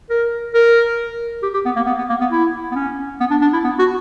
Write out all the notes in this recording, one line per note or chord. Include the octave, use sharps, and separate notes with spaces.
A#4
A#4
G4
G4
B3
A#3
B3
B3
A#3
B3
E4
B3
C#4
B3
D4
D4
E4
B3
F#4